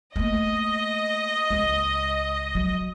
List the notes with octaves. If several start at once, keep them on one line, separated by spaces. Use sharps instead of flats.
A3 A#3 D#5
C#2
F#3